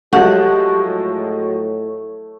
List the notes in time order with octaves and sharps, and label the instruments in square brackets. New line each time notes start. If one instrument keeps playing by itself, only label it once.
[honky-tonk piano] F3 F#3 G#3 [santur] A3 C#5 [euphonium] G4 [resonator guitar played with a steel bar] F#5
[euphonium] A2